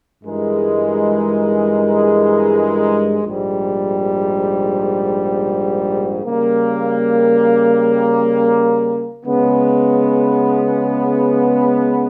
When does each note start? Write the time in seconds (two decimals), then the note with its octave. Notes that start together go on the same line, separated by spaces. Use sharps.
0.23 G2 E3 G#3 D#4 A#4
3.23 A#1 G#2 G3
6.24 C#3 G3 A#3
9.23 C#3 G#3 B3